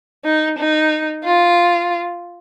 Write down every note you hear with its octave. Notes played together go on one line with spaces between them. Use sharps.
D#4
D#4
F4